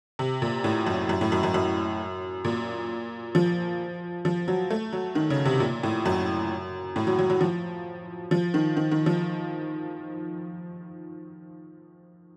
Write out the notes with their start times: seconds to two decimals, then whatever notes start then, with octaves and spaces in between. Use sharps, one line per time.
0.19 C3
0.42 A#2
0.64 A2
0.86 F#2
1.09 F#2
1.21 A2
1.32 F#2
1.43 F#2
1.54 F#2
2.45 A#2
3.35 F3
4.25 F3
4.48 F#3
4.70 A3
4.93 F#3
5.15 D#3
5.30 C#3
5.45 C3
5.60 A#2
5.83 A2
6.06 F#2
6.96 A2
7.07 F#3
7.19 F#3
7.30 F#3
7.41 F3
8.31 F3
8.54 D#3
8.77 D#3
8.91 D#3
9.06 F3